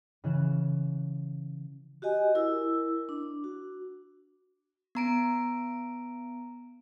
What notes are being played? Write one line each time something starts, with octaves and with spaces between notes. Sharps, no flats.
C#3 E3 F#6 E7
F#4 G4 D#5 G#5
E4 A#4 E6
D4
F#4
B3 A#5 D7